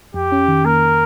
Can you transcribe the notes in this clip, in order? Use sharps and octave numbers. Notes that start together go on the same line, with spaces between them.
F2 G4
C#4
D#3
A#3 A#4